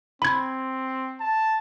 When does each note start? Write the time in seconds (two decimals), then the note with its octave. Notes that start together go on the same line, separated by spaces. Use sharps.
0.22 C4 B5 G#6
1.21 A5